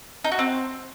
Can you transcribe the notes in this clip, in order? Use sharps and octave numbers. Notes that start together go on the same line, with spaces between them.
D#4
F#4
C4